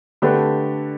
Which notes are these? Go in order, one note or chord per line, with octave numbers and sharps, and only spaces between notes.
D3 A3 D4 G4 B4